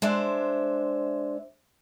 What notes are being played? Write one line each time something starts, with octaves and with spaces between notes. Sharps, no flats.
G#3 D4 C5 E5